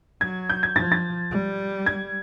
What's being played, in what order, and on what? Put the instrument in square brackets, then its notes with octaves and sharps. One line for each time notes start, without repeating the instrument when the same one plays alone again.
[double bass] F#3 [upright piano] G#6
[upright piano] G6
G#6
[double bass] F3 [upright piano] A6
[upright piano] A6
[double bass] G3
[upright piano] G#6